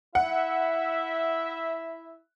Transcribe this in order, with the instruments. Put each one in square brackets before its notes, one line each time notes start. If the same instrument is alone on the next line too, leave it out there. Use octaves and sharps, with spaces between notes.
[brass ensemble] E4 E5 [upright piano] F#5